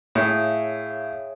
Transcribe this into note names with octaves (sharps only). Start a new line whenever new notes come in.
A2 G#4 C#5 E5 F5 G5